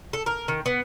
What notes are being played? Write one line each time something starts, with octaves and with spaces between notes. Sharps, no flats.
A4
A#4
D#3
B3